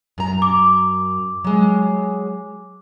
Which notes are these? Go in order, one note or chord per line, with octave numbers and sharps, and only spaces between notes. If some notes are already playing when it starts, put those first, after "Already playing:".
F#2 A#5
D6
F#3 G#3